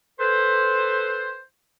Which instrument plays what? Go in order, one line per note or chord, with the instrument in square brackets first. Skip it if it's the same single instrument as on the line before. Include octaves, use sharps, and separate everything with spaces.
[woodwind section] A4 B4 C5